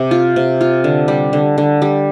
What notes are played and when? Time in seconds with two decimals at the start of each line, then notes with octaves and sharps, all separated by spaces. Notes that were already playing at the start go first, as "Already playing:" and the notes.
Already playing: C3 C4
0.11 F4
0.36 C3
0.61 F4
0.84 D3
1.08 G3
1.33 D3
1.58 D3
1.82 G3